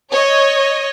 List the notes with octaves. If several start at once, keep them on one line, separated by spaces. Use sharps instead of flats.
C#5 D#5